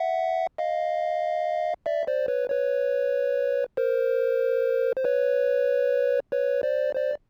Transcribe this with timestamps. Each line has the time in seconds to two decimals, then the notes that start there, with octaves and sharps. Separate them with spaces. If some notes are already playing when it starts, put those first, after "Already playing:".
Already playing: E5 F#5
0.58 D#5 F5
1.86 D5 E5
2.07 C5 D5
2.28 B4 C#5
2.49 B4 C#5
3.77 A#4 C5
4.96 C5
5.04 B4 C#5
6.32 B4 C#5
6.63 C5 D5
6.95 C5 D5